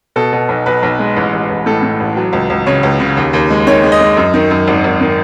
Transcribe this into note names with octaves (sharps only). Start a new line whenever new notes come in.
B2 A4
B2
B1
B1 B4
B1
G#3
A1
A1
A1
A2 A4
A2
A1
F#3
C#2
C#2
C#3 C#5
C#2
C#3
D#2
D#2
G#3
D#3 C#5
G#3
D#5
G#3
F#2
D#3
F#2
G#1
G#1
D#3